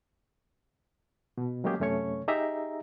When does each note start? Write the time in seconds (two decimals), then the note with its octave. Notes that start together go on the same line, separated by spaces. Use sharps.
1.38 B2
1.64 F#3 G#3 A#3 C#4 G4 G#4
1.80 F#2 C3 A3 C#4 C#5 C#6
2.28 D#4 G4 G#4 D#5 E5 A#5